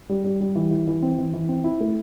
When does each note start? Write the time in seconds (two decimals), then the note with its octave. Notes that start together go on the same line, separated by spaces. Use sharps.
0.09 G3
0.24 G3
0.41 G3
0.55 E3
0.71 E3
0.87 E3
1.02 C4
1.18 E3
1.34 E3
1.48 C4
1.64 E4
1.81 A3